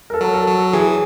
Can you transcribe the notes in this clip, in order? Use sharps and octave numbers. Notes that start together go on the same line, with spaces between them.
A#4
A4
F#3 A#4
A4
F#3
E3 G#4